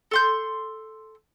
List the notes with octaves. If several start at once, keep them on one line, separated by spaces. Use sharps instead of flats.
A4 C6 G6